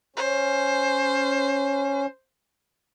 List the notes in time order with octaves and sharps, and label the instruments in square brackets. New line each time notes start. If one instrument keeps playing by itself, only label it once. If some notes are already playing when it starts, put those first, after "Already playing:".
[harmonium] C#4 [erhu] C5